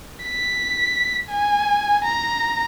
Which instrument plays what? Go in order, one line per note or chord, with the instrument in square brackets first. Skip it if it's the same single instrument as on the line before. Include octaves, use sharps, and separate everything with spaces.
[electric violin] B6
G#5
A#5